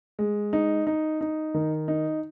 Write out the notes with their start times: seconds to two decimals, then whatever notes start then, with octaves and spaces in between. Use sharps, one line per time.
0.19 G#3
0.53 D#4
0.87 D#4
1.21 D#4
1.54 D#3
1.88 D#4